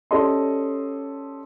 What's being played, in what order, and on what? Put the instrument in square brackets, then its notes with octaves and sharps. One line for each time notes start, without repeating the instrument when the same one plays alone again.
[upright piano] C#4 G4 A4 D5 D#5 C6